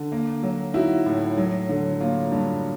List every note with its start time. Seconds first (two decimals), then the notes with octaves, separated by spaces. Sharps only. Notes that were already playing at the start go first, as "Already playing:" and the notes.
Already playing: D3
0.12 A#3
0.43 F#3
0.74 D#4 E4 F#4
1.06 A2
1.38 F#3
1.69 D3
2.00 A#3 F4
2.32 G2